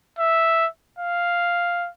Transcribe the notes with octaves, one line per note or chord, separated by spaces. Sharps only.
E5
F5